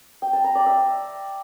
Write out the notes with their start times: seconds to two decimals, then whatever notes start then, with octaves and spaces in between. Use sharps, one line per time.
0.22 G5
0.33 A5
0.44 A#5
0.55 D5
0.66 E5